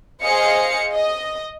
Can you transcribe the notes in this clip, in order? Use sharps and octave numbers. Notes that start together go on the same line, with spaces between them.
G#4 C5 D#5 F5 C#7
D#5